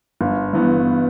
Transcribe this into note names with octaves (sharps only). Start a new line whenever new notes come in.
G1
G2 E3 B3